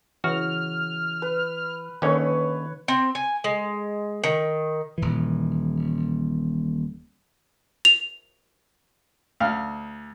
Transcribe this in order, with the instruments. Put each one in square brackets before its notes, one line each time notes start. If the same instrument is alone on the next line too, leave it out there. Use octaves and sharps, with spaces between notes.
[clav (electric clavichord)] C#3 F#4 [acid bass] E3 [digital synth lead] F6
[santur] B4
[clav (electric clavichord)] D#2 D3 C#4 [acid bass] D#3 [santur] B4 C#5
[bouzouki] C4
G#5
G#3
D#3
[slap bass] D#1 E3
[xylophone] F7
[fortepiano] D2 F5 F6